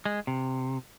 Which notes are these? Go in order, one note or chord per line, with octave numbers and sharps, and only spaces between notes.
G#3
C3